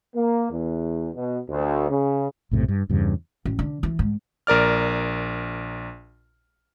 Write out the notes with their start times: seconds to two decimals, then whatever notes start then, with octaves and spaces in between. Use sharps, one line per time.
0.15 A#3
0.50 E2
1.15 B2
1.49 D2
1.90 C#3
2.51 A#1 F#2 A2 C3
2.68 G2
2.89 E2 G2 C#3
3.45 A1
3.59 D3
3.83 E3
3.99 G#2
4.47 A#1 A#4 D5 F6